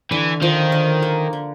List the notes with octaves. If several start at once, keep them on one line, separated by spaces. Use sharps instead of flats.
D3 E3
D#3 F3
D3
A#3
D3